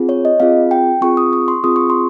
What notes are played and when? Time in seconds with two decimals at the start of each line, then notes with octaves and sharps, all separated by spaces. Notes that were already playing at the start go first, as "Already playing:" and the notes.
Already playing: C4 F4 G#4
0.09 C#5
0.25 D#5
0.40 C4 F4 G#4 F5
0.71 G5
1.01 C4 F4 G#4 C#6
1.17 D#6
1.33 C#6
1.48 C6
1.63 C4 F4 G#4 D#6
1.76 C#6
1.90 C6